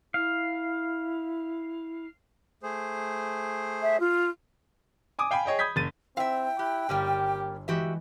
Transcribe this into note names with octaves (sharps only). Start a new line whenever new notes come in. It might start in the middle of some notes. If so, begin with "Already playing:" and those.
E4 F5
A3 G#4 C5
E5
F4
G#5 D6 D#6
F5 G5 G#5 B5
G#4 C#5 D#5 G5
B5 D#6 G6 G#6 B6
F#1 A6 D#7
C4 E4 E5 F5 G5
E4 G4 F#6
G1 G3 A#3 C#4 G4
E3 G#3 F#4 G4 E5